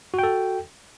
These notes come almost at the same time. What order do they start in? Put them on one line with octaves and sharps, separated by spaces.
F#4 G5 A4